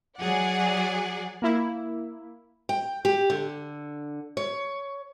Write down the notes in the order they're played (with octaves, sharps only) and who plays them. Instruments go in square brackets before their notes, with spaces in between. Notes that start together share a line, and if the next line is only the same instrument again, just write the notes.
[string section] F#3 G#4 D5 F#5
[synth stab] A#3 E4
[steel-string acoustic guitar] G5
G4
D3
C#5